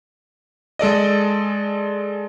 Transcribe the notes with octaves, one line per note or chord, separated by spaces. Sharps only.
G#3 A4 D5 D#5